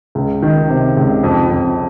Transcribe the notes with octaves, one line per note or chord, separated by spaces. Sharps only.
C#2
D#3
C3
C#2
F2
F2